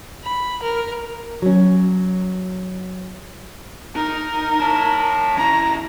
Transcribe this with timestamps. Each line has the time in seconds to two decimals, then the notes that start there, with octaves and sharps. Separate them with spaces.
0.24 B5
0.63 A#4
1.42 F#3 C#4
3.96 D#4 A#4
4.60 C#5 A5
5.38 C#4 E4 A#5